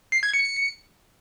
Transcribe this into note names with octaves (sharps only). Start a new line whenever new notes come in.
C7
G#6
C#7